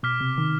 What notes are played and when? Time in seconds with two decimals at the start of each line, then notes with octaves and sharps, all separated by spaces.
0.03 B2 D6 F6 B6
0.20 C3
0.38 D#3